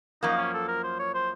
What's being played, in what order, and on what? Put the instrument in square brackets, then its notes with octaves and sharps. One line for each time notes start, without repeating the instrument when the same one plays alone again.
[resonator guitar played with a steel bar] F#2 F3 A#3 [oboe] D#4
[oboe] C#4
A4
A#4
C5
C#5
C5